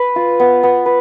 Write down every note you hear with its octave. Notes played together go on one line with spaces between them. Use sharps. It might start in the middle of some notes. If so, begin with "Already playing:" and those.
Already playing: B4
F4
B3
B3
B4